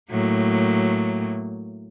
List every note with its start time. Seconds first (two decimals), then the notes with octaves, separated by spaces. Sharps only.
0.10 A2 F#3 A#3